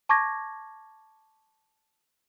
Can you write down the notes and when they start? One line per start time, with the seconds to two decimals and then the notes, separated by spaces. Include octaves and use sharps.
0.09 A5 C#6 D6 G#6 A#6